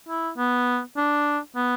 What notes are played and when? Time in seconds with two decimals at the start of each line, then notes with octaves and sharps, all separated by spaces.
0.09 E4
0.38 B3
0.97 D4
1.56 B3